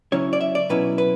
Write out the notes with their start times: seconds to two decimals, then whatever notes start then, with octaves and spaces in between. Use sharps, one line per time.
0.12 C#3 F#3 C#4 E4 C#5
0.33 D5
0.41 E5
0.55 D5
0.69 B2 F#3 C#4 E4 B4
0.98 B4